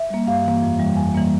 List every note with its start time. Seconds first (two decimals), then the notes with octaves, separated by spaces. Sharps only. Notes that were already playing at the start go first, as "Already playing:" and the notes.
Already playing: E5
0.10 G3 A#3
0.27 G2 F5
0.45 E3 A#3
0.62 F2
0.79 E3 G3
0.96 F2 G#5
1.14 E3 G3 A#3